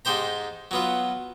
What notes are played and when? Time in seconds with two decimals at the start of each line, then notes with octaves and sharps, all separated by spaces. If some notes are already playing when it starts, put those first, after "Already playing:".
0.05 G#2 D#4 G4 C5 A#5
0.71 F#3 B3 F4